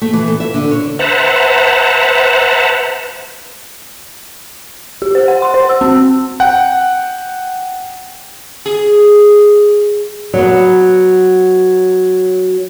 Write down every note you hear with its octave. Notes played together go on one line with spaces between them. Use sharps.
A3
E3
A4
E5
D3
C#5
B4 C5 E5 F#5 A5 A#5
G4
C5
F#5
C6
C5
E6
C4
F#5 G5
G#4
F#3 B3